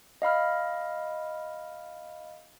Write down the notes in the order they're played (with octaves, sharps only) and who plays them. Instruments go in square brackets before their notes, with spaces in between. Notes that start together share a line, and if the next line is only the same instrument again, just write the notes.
[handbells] D#5 F5 B5 F6